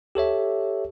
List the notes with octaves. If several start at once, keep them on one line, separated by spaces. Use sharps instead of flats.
G4 A4 C#5 E5